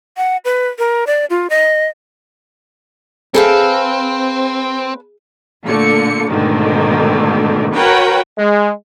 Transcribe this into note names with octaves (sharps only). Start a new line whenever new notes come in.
F#5
B4
A#4
D5
F4
D#5
C4 G#4 A4 B4 E5 F5
A#2 D3 A3 C#7
G#2 B2 D3 D#3 A3
F#4 A#4 B4 C#5 F#5 G5
G#3